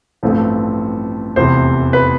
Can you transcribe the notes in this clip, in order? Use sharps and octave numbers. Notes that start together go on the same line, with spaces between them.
A1 G2 F3 A3 C4
F1 E2 C3 E3 C5
B4